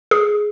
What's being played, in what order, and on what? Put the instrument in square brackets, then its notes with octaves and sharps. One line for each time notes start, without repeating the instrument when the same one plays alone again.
[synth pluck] G#4